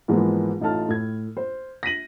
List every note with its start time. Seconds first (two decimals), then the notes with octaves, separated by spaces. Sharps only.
0.08 G#2 E3 F3 G#3 A#3 B3
0.61 A1 D#4 F4 A4 A5 F6
0.89 A2 G#6
1.37 C5
1.83 A#6 B6 D#7 F#7